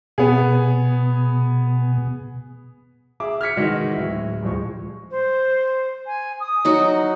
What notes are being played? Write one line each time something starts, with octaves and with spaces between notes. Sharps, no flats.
B2 B3 G#4
G#4 E5 D6
F6 G#6 B6 C#7
D#3 E3 G#3 F#4
D1 E4
D#1 F3 G#3 C#6
C5
G#5
D#6
F#3 D#4 F#4